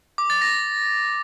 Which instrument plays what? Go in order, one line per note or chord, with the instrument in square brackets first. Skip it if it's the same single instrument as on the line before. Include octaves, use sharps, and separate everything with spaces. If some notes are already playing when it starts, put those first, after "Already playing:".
[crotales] D6
A6
A#6